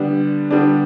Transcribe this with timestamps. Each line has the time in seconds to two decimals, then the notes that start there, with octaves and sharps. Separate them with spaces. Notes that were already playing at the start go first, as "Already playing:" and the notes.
Already playing: D3 G3 B3 D4
0.51 D3 G3 B3 D4